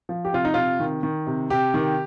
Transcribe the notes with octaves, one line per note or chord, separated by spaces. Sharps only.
F3
G4
C3 F4
D#4
C3 F4
D#3
D#3
C3
C3 G4
D#3